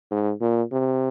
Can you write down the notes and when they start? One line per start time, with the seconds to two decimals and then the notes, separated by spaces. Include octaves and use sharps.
0.11 G#2
0.41 A#2
0.72 C3